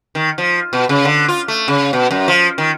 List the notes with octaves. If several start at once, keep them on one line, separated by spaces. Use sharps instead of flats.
D#3
F3
B2
C#3
D3
F4
A3
C#3
B2
F#2
F3
D#3